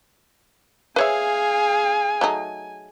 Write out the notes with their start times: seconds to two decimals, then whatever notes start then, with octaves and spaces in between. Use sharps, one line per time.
0.96 G#4 B4 C#5 E5 F5 G#5
2.21 F#3 A3 D#4